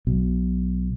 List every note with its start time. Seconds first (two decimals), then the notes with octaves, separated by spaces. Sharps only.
0.07 B1 B2